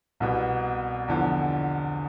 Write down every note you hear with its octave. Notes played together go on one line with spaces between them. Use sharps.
C2 B2 B3
E2 D3 F3